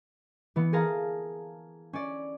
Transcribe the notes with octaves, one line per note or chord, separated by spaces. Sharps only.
E3 B3
G#4 A#4 F5 A5 A#5
C#4 D5